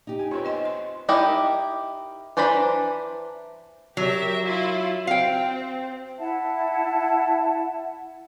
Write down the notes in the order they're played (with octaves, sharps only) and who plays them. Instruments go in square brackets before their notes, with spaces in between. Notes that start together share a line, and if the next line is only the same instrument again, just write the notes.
[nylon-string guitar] D#4 G4
[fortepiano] G#5
[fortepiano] B3 C4 C#5 [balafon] F4
[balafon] D#5 G#5 C6
C6
[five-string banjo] D#4 E4 G4 A#4 D#5
E3 D4 C5 A#5 B5
[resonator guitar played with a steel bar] F#3 [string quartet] G4 A#4 E5
[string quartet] E4 F4
[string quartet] C4 [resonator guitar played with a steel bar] F5 G5
[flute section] E4 E5 F#5 A5